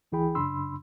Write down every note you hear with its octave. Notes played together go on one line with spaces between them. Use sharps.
D2 E3 E4 G#4 G5 B5
F#2 C#3 D4 B5 C6 E6